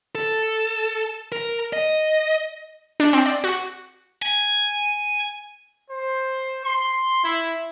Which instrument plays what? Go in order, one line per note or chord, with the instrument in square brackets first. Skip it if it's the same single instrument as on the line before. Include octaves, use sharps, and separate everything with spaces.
[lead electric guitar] A4
A#4
D#5
[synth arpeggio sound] D4
C4
D5
F#4
[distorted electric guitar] G#5
[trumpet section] C5
C6
E4